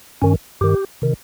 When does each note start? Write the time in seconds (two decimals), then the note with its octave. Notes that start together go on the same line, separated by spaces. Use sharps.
0.22 G2 D#3 C#4
0.61 G2 D#3 G4
1.02 C3 D#3